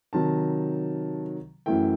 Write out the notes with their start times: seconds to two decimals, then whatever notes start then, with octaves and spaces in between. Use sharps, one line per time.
0.13 C3 D#3 F#3 A5
1.66 F#2 E3 A3 E4 G5